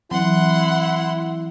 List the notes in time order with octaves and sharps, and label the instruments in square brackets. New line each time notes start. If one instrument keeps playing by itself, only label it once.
[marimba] E3 F#3 C4 [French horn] E4 [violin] F#5 C6